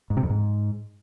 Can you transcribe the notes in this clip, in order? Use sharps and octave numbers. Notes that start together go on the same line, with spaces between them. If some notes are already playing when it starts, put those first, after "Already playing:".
G#2
C3
F2
G#2